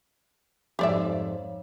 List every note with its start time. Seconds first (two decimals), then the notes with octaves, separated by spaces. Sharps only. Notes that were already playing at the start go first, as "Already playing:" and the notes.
0.79 F2 G#2 G4 C#5 D5 E5 F5